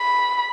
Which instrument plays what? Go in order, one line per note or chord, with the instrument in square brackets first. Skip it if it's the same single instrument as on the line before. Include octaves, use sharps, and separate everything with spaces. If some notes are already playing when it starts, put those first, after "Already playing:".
Already playing: [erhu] B5